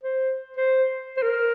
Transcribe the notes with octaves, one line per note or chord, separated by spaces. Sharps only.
C5
C5
C5
A#4